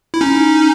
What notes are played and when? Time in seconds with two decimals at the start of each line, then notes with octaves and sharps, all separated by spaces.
0.14 E4
0.21 C#4 D#4